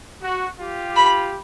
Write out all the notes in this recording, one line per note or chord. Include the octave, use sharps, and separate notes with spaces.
F#4
F4 G4
B5